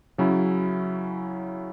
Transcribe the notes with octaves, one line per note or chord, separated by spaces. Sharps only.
C#3 F#3 C#4 E4